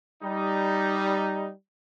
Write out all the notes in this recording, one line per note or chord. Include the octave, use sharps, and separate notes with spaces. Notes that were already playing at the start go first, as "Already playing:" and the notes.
G3 D#4